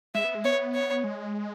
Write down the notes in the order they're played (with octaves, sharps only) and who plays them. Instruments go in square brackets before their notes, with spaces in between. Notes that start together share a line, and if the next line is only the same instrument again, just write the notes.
[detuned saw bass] G#3 [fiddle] E5
[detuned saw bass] B3
G#3
[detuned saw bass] B3 [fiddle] C#5
[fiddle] C#5
[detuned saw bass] G#3